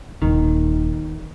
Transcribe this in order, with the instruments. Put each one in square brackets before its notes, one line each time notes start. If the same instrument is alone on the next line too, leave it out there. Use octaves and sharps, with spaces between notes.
[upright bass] D#1 [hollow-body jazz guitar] D#3